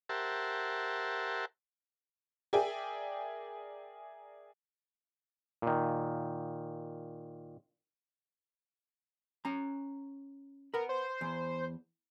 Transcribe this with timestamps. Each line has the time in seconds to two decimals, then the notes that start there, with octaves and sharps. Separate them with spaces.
0.09 G4 A#4 C5 E5 F#5 A5
2.53 G#4 A#4 D5 E5 G5 G#5
5.62 A#2 D#3
9.45 C#4 A#5
10.74 A#4 B4 F#5
10.89 C5
11.21 E2